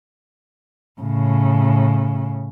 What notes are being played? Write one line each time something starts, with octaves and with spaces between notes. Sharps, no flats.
A2 C#3